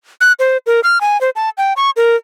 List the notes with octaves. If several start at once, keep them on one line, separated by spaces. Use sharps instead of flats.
F#6
C5
A#4
F6
G#5
C5
A5
G5
C#6
A#4